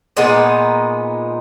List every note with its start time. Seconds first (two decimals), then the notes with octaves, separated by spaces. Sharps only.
0.17 A#2 G#3 B3 D#4